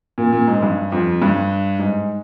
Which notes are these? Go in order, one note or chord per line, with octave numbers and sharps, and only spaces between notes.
A#2
A#2
G#2
G2
F2
G2
G#2